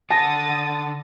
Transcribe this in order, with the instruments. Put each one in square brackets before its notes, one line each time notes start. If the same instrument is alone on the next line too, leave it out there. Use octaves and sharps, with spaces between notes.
[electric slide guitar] D3 F#5 [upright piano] A5 A#6 [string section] D#6 A6